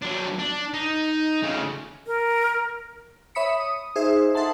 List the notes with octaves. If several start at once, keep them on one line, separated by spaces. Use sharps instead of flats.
F#3 D4
D4
D#4
C#3 A3
A#4
C#5 E5 B5 D#6 B6 C#7
D#6
D#4 G#4 C5 E5
D#4 A4 E5 F#5 A5 C6